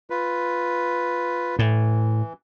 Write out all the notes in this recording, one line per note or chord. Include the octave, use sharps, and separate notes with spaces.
F4 B4
A2 E3